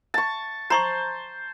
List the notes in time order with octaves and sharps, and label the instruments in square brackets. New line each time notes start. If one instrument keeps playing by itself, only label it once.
[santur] A5 C#6
[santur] C5 A5 [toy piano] A#5 C6 C#6